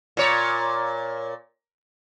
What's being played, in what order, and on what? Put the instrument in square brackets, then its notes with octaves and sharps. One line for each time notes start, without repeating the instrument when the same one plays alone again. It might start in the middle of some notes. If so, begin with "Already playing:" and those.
[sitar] A#2 C#5